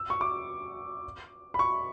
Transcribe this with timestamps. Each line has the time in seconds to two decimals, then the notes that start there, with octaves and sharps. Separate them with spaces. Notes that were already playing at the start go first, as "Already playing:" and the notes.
Already playing: E6
0.10 C#6
0.21 D6
1.54 B5
1.59 C#6